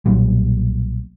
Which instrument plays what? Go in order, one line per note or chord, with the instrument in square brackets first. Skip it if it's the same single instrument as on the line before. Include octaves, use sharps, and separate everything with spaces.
[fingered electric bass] B1 A#2 F#3 G3